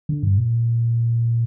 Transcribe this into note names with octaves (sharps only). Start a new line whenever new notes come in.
D3
G2
A#2